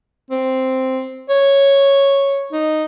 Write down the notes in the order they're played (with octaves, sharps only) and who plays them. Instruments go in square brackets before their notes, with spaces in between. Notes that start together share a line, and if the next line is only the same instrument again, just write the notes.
[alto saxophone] C4
C#5
D#4